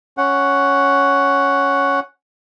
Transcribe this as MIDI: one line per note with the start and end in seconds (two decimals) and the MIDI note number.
0.18 2.00 61
0.18 2.00 78